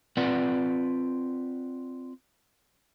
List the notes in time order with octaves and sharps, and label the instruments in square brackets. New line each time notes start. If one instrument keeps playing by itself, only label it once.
[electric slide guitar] C4 F4 B4 D5 F#5